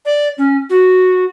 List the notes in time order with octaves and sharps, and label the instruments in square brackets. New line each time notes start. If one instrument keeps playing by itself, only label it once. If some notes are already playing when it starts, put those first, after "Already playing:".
[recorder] D5
C#4
F#4